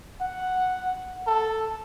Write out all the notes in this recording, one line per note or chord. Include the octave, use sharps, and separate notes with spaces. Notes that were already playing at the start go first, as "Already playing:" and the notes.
F#5
A4